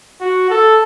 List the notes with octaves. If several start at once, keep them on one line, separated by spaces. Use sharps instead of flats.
F#4
A4